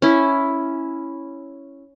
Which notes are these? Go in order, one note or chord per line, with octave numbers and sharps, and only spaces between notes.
C#4 E4